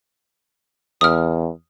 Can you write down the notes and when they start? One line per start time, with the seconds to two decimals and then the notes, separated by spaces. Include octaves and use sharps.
1.01 E2 D#6 F6